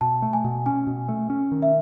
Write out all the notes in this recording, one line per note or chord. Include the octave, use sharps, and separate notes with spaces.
B2 A5
A3
G#5
B2
C#4 G#5
B2
A3
C#4
D#3
E5